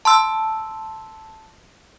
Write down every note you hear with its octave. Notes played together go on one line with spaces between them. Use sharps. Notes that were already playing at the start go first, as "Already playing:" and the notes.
A5 C6 E6